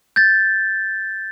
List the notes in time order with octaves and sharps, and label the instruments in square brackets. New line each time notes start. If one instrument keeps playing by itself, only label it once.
[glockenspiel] G6 A6